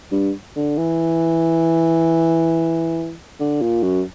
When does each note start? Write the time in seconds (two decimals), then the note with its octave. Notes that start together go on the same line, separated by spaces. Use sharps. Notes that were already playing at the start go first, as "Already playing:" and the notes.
0.12 G2
0.56 D3
0.77 E3
3.40 D3
3.62 A#2
3.83 F#2